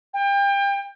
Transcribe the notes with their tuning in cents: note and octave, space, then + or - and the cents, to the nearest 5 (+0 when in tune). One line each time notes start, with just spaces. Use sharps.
G5 +30